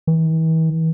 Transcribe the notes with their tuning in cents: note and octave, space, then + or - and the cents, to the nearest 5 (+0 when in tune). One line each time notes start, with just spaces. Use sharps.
E3 -40